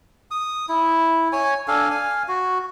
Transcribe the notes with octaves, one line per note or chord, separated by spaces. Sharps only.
D#6
E4
C#5 G#5
D4 A4 F5 G#5
F5 G#5
F#4